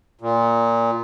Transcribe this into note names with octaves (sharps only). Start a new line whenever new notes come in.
A#2